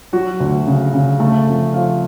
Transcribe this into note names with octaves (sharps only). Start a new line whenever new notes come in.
F#3 F#4
D2
C#3
C#3
A3 A4
F2
F3 F5